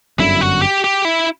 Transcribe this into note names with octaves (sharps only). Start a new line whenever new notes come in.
G1 F#2 D3 E4
F#4
G4
G4
E4